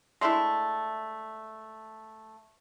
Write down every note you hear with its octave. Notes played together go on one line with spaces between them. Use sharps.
G#3 A3 D4 E4